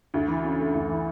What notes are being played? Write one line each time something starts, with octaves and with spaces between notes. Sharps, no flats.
D2
E3
C#3
A3
D2
E3